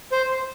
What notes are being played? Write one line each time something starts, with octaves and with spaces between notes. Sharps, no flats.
C5